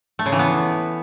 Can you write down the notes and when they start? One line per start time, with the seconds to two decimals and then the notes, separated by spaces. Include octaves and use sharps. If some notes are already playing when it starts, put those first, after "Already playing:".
0.19 A3
0.26 C#3
0.32 E3
0.39 B3